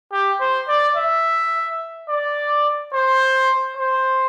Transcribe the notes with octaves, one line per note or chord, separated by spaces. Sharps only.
G4
C5
D5
E5
D5
C5
C5